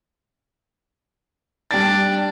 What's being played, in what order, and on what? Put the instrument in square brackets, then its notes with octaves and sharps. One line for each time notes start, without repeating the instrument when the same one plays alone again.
[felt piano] G3 A6 [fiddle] D4